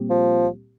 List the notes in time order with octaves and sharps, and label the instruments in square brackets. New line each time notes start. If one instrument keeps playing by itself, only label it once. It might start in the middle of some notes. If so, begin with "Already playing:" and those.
Already playing: [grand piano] A#2 G3 C4 G4
[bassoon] F3